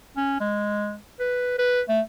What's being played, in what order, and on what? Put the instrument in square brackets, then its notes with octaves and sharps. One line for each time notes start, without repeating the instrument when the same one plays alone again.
[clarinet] C#4
G#3
B4
B4
A3